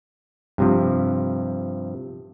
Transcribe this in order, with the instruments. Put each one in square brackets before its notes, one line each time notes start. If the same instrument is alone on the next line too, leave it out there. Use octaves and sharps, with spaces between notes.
[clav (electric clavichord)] G2 C3 F3